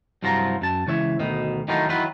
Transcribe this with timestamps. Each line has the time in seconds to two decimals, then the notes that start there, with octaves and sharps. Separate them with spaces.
0.23 C2 G2 F3 F#3 F4 A#5
0.61 F#2 A5
0.87 C#2 E3 C#5 E5
1.20 D2 B2 D#3
1.68 D#3 E3 F#3 A3 D#4 F4
1.89 D#3 E3 F#3 F4 B4